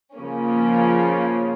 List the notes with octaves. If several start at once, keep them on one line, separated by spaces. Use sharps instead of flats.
C#3 F3 A#3 C#4